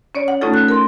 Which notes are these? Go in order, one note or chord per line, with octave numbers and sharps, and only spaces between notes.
C#4 C#5 D5
F#5
A3 C#4 D#4 F4 A4
F#6
A#4 C6